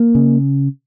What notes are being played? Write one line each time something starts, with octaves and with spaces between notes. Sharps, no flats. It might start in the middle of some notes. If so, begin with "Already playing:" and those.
Already playing: A#3
C#3